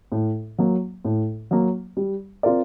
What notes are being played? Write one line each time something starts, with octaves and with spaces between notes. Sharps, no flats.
A2
F#3 A#3
A2
F#3 A#3
G3
C4 F4 A#4 D5